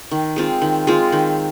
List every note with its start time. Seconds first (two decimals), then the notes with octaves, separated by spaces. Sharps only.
0.11 D#3
0.36 G#3 C4 F4
0.62 D#3
0.87 G#3 C4 F4
1.12 D#3